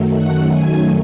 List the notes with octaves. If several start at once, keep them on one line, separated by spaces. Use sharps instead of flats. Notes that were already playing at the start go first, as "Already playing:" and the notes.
Already playing: F#2 D#3 F#3 A3
F#5
G#5